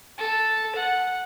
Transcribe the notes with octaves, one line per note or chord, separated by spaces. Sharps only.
A4
F#5